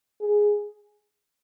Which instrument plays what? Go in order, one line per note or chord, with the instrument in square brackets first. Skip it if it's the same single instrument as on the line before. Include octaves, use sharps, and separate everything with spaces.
[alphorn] G#4